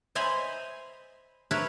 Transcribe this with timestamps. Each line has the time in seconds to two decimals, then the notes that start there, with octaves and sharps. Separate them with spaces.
0.15 C5 D#5 E5 G#5 A#5 B5
1.51 A#4 B4 C#5 E5